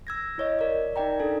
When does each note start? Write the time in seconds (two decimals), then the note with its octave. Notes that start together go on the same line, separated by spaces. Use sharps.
0.07 E6 G#6 A#6
0.38 E4 C#5 D#5
0.59 A#4 D5
0.96 D#4 A#4 D5 G5 A#5
1.19 D4 D#4 A4 G#5